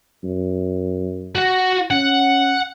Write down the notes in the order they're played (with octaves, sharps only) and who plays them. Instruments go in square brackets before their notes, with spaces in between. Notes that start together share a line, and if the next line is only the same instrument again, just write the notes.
[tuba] F#2
[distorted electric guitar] F#4 F#5
[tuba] C#4 [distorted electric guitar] F#5